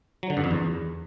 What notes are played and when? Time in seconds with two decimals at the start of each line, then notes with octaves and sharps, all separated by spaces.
0.23 F#3
0.30 D3
0.37 G2
0.44 F2
0.51 E2